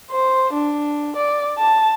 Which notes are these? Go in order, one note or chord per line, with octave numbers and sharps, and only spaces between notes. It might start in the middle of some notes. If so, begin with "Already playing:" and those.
C5
D4
D5
A5